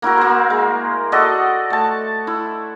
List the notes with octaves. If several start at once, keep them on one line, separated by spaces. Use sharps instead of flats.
A#3 E4 F#4 A#4
A#3 C5
G#3
F#4 A4 D5 D#5
A3 A5
E4